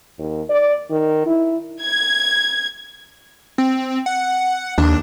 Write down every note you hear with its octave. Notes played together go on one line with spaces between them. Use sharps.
D#2
D5
D#3
E4
G#6
C4
F#5
D#2 D4